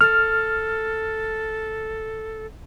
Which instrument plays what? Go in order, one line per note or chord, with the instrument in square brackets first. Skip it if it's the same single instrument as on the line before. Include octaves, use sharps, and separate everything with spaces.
[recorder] A4 [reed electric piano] F6